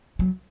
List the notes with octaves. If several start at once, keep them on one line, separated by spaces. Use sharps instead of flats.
F#3